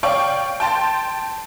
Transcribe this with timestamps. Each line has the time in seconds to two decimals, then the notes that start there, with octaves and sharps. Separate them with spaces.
0.03 C#5 D5 F5 G5 C#6 D6
0.60 G5 A5 C6 A6